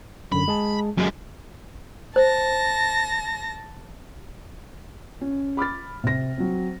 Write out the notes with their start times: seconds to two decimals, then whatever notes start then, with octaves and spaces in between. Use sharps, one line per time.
0.32 F#2 D3 B5
0.48 G#3 G#4 A5
0.97 F#2 G#3
2.16 C5 A5 A#6
5.21 C#4
5.57 B5 D6 F6 A6
6.04 C3 A#6
6.38 F#3 C4